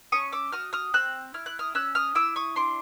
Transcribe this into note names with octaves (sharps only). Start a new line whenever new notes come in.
C#4 C#6 D#6
D6 E6
F#4 D#6 F6
D#6 F6
C4 E6 F#6
E4 F6
F#6
D#6 F6
C#4 E6 F#6
D#6 F6
E4 D6 E6
C#6 D#6
D4 C6 D6